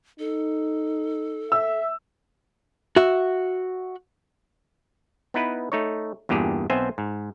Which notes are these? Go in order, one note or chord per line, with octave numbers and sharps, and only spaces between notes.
D#4 A4
E5 E6
F#4 E5
B3 D#4 E4 B4
A3 D#4 C#5
E2 G2 A#2 G4 G#4
B1 B3 C4 C5 E5 G#5
G#2